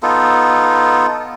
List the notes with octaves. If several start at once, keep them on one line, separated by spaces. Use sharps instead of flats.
B3 D#4 F4 A4